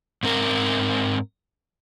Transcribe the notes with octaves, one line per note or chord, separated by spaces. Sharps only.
G#2 C4 A#4